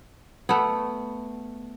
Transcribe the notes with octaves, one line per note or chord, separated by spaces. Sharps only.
A3 B3